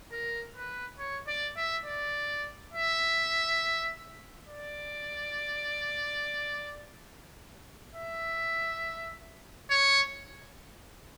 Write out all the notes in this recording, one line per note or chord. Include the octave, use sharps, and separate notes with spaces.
A#4
B4
C#5
D5
E5
D5
E5
D5
E5
C#5